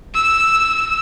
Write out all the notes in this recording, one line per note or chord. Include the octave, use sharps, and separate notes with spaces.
E6